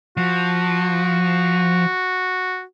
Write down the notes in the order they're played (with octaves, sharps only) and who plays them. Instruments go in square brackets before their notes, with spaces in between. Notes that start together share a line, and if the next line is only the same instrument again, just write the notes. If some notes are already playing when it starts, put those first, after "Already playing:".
[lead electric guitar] F3 [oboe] F#4